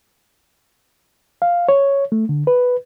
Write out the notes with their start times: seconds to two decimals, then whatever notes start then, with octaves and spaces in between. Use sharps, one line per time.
1.42 F5
1.69 C#5
2.12 A3
2.29 D3
2.47 B4